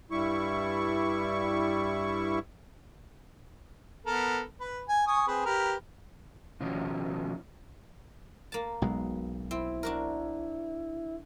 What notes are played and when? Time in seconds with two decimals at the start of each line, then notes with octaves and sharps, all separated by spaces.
0.11 G2 G3 E4 C#6
4.06 B3 A4 A#4
4.61 B4
4.89 G#5
5.07 G#5 C#6 D#6
5.28 C4 G#4 B4
5.45 G4 A#4 B4
6.60 B2 D#3 F3 C#4 F#4
8.52 A#3 A5
8.82 B1 B2 G#3
9.51 C4 E4
9.83 D4 F#4 A#4